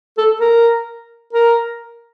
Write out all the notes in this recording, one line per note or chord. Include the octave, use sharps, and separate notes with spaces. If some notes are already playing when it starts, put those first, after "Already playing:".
A4
A#4
A#4